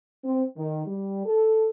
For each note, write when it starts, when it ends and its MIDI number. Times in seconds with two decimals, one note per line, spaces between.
0.24 0.43 60
0.56 0.84 51
0.85 1.22 55
1.25 1.70 69